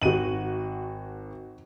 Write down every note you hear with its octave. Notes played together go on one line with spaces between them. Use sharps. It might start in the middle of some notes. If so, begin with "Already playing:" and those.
G#1 F#4 D#7 F#7